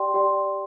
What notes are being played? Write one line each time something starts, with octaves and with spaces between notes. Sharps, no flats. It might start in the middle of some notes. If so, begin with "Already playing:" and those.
Already playing: G4 D5 G5 C6
G4 D5 G5 C6